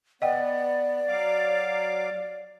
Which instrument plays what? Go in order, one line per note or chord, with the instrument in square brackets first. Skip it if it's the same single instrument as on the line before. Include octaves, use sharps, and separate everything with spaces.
[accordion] B3 [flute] D5 [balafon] D#5 F#5 G5
[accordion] F#3 F5 D6